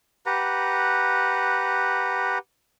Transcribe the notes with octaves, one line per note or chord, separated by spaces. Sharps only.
G4 B4 F#5 A#5